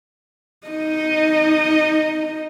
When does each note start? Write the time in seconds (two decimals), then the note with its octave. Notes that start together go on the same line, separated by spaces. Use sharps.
0.67 D#4 D#5